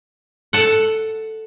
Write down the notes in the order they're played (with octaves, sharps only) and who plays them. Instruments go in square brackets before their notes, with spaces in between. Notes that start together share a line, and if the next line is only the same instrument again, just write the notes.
[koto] A4 F#5